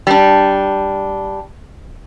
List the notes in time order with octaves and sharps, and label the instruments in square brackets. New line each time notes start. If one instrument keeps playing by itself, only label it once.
[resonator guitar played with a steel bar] G3 D4